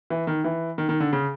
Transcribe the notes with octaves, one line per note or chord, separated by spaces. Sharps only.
E3
D#3
E3
D#3
D#3
D3
C#3